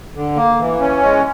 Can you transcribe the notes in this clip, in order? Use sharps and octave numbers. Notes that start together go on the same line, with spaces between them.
D3
A#3
E3
C#4
G#3